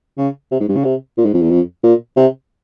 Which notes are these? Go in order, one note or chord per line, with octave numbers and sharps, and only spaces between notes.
C#3
C3
G#2
G2
C#3
C3
A#2
G#2
F2
E2
F2
A#2
C3